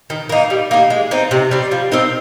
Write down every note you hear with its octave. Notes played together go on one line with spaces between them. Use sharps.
D#3
A#3 D#4
G3
A#3 D#4
G#3
C4 D#4
C3
G3 C4
F3
C4 D#4 A#4